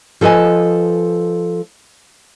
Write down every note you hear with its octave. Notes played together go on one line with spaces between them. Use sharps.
F3 A4 B4 D#5 G#5